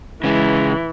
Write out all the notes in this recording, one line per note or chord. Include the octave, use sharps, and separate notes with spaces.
C#3 E3 G#3